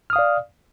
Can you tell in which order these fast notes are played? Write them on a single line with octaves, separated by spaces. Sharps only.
F6 D#6 F5 D5